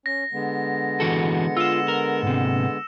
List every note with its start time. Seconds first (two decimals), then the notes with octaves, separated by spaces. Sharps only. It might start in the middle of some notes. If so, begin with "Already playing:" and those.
0.06 C#4 A#6
0.33 D3 G#3 B3
1.00 E3 F#4 A4 C#7
1.57 F4 E6 E7
1.88 A#4
2.23 G#2 C3